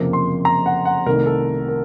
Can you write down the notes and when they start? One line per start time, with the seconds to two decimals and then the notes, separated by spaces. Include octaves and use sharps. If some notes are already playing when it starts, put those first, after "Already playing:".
Already playing: F#1 F2 C3 F3 A#3
0.13 C6
0.45 A#5
0.66 F#5
0.85 F#5
1.06 C2 C3 D#3 A3 A#4
1.26 A4
1.68 A#4